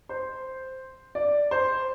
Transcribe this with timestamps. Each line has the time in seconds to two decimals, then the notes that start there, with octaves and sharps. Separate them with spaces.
0.09 C5
1.15 D5
1.51 C5